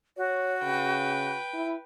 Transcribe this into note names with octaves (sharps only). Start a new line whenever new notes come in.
F#4 C#5
C#3 B4 G5
E4